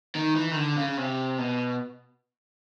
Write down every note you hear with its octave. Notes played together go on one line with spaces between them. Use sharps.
D#3
E3
D#3
D3
C#3
C3
B2